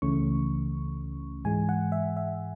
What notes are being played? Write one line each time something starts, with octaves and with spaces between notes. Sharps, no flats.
C#2 C#3 E3 A3 C#4 C#6
G#2 E3 G#3 G#5
F#5
E5
E5